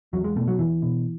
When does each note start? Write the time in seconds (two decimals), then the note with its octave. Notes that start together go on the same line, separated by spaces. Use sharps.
0.13 E2 F#3
0.24 G#3
0.36 B2 A3
0.48 F#3
0.59 E2 E3
0.82 B2